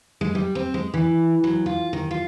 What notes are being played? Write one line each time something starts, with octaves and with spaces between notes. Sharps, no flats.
G#3
G3
C4
G#3
E3
F#3
F4
D#3
F4